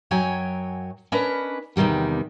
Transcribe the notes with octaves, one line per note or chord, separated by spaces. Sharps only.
F#2 F#3 C#5 G5 G#5
C#4 D4 A#4 B4 D#5
E2 C3 D#3 G3 B3